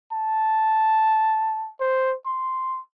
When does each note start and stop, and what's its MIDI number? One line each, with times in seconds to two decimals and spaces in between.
0.12 1.70 81
1.80 2.15 72
2.26 2.80 84